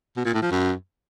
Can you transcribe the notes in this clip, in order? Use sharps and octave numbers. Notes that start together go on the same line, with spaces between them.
B2
A#2
A2
F3
F#2